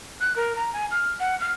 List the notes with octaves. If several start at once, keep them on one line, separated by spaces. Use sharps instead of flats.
F#6
A#4
A#5
G#5
F6
F#5
F6